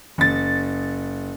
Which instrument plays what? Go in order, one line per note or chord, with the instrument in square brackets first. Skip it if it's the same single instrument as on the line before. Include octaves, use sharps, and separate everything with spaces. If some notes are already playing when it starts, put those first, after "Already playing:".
[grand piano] F#1 A6